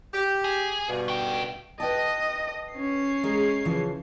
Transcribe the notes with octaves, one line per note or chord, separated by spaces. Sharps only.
G4
G#4
G2 B2
C#3 G5
B4 D#5 G5 A5
C#4 C7
G#3 A#4
C#3 E3 F3